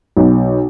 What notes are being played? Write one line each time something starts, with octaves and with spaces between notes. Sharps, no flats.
B1